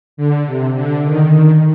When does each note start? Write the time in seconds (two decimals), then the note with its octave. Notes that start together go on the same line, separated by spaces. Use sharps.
0.17 D3
0.46 C3
0.76 D3
1.05 D#3